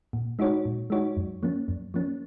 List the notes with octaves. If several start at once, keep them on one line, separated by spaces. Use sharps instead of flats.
A#2
G#3 D#4 F#4 C#5
A#2
G#3 D#4 F#4 C#5
F#2
F3 A#3 C#4
F#2
F3 A#3 C#4